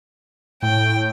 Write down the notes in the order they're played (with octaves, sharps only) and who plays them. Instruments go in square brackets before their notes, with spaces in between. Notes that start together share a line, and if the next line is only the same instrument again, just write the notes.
[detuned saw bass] A2 [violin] G5